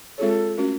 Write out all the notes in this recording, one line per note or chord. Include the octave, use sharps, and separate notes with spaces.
G#3 C4 F4 G#4 A4 C#5
A3 C#4 F#4 A#4